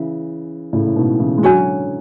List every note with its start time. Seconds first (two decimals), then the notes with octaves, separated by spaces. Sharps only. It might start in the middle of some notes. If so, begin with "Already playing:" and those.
Already playing: C#3 E3 E5
0.73 A2 C#3
0.86 C#3
0.96 G#2 B2
1.19 C#3 E3
1.38 G#3
1.43 D3 F#3 C#4 F#4 C#5 G#5